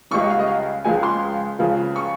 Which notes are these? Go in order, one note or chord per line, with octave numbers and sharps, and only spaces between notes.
C#2 C#3 G3 C#6
D#5
F5
D#5
F5
C#2 C#3 F3 G#3 G#5
C6
C#2 C#3 F3
C#6